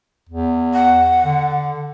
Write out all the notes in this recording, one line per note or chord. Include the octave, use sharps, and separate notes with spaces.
E2
F#5
D3